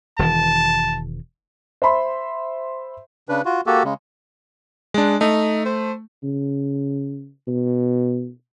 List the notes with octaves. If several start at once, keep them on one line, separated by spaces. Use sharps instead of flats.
E1 D#3 E3 A5
C5 E5 B5 C6
C#3 D4 B4
F4 F#4
A#3 F#4 G4 A4
C#3 G#3
G#3 D4
A3 D#4
C5
C#3
B2